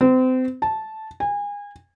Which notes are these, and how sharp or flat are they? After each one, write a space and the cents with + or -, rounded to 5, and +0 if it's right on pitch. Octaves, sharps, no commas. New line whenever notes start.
C4 -30
A5 -10
G#5 -30